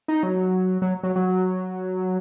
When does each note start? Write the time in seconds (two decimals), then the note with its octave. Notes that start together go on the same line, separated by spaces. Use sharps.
0.08 D#4
0.23 F#3
0.82 F#3
1.03 F#3
1.16 F#3